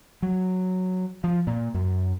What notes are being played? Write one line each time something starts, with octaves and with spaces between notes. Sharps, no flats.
F#3
F3
A#2
F#2